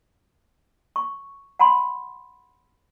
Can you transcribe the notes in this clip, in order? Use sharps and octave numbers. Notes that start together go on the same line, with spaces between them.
C#6
F#5 A5 B5 C6